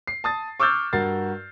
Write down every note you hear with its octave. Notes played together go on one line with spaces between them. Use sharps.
C7
A5 D#6 A6
C#6 D6 E6 F6 G6 A6
G2 F#4 A#4 A6 C7